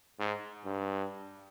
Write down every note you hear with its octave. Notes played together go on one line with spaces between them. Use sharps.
G#2
G2